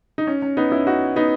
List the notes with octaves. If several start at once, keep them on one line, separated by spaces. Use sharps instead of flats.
D#4
C#4
C#4
B3 D#4
C#4 E4
D#4 F#4
B3 D#4